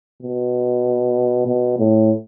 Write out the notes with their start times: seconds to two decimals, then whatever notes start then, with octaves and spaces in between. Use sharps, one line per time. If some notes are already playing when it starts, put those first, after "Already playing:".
0.22 B2
1.47 B2
1.79 A2